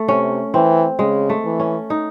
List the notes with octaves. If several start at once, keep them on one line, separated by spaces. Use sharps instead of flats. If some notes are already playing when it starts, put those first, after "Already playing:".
Already playing: A3
C3 C#4
E3 C4
C#3 G#3
A3
E3
C#4
D#4